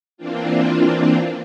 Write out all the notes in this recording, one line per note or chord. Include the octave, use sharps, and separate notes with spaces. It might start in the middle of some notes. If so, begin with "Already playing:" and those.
E3 A#3 C4 D4 F4